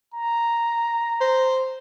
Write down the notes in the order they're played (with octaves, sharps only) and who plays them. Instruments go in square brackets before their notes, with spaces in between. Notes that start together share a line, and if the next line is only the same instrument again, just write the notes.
[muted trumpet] A#5
[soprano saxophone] C5